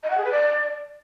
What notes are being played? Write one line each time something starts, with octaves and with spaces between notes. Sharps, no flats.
D#5
F#5
G#4
B4
D5